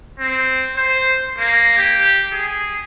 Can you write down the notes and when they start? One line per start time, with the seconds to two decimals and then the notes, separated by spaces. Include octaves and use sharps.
0.19 C4
0.77 C5
1.38 A#3
1.78 G4
2.32 G#4